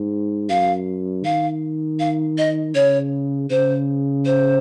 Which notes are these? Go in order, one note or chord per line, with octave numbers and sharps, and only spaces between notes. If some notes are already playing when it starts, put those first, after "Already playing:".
Already playing: G#2
F#2 F5
D#3 F5
F5
D#5
C#3 C#5
C#3 C5
C5